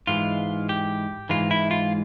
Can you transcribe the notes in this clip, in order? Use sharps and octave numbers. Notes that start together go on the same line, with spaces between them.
G#2 E3 G#3 F4
G4
G#2 E3 G#3 F4
E4
F4